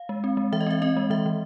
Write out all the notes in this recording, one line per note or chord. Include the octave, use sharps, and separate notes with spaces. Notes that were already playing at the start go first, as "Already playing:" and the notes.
Already playing: F5
G#3
C4
G#3
E3 E5
D#5
C4 E5
C4 D#5
G#3
E3 E5
E3